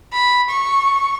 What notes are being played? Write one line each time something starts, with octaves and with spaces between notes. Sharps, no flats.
B5
C#6